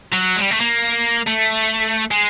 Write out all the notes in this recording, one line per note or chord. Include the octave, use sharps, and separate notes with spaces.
F#3
G#3
G3
A3
A#3
A3
G#3